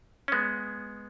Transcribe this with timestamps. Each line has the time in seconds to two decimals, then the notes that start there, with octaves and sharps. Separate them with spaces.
0.28 C#4
0.32 G#3 B3